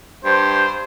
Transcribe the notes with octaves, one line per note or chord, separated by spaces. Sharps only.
G2 C5